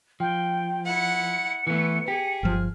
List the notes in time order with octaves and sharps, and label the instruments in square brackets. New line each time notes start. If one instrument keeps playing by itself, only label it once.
[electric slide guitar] F3 [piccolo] G5
[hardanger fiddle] E4 F#5 [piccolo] C#7
[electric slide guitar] E3 A3 [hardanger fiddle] B3
[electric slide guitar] G4 [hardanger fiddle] G#4
[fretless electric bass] G1 F3 [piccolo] F6